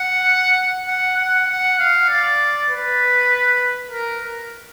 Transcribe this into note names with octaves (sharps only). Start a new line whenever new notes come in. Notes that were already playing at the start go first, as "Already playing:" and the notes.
Already playing: F#5
F#5
F#5
F#5
F5
D5
B4
A#4